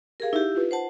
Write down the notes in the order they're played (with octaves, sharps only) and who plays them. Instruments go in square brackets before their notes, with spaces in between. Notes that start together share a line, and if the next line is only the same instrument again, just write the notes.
[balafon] G4 F5 [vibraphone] G#4 A#4
[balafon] D#4 E5 [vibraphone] E4 G4
[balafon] F4 B4
[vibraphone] C5 F#5 A5